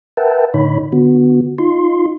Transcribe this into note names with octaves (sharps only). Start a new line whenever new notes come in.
A#4 B4 E5 F#5 G5 A5
A2 D3 D#4 C#5 B5
D3 B3 F#4
D#4 F4 C6